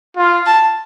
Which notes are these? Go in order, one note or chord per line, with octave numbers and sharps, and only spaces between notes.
F4
A5